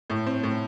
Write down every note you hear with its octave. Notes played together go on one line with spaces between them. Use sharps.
A2
C4
A2